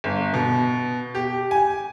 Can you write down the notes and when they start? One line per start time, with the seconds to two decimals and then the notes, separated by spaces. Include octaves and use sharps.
0.04 G1
0.34 B2
1.15 G4
1.51 G#5